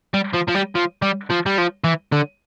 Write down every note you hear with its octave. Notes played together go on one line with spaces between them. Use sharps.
G3
F3
F3
G3
F3
G3
F3
G3
F3
E3
D3